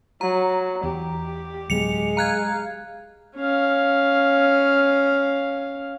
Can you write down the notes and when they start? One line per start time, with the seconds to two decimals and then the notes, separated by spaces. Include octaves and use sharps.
0.21 F#3 A#5
0.83 E2 G4
1.70 D1 F#3 G#3 B3 C#7 F7
2.17 F5 A#5 F#6 G#6
3.36 C#4 F5